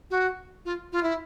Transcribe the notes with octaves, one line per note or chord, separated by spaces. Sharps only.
F#4
F4
F4
E4